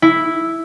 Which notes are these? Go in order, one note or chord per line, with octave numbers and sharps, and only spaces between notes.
E4